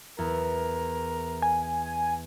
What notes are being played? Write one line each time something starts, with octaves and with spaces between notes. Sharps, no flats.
E2 A#4
G#5